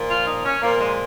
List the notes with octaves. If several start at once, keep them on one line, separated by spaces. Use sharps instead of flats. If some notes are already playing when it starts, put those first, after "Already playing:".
Already playing: A#2 F3
F4
D#4
C#4
A#2 F3 A#3
G#3